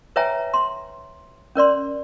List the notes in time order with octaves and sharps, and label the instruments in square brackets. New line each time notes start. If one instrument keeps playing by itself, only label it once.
[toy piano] B4 C#5 E5 G5 G#5 A#5
C6
C#4 A#4 D5 C6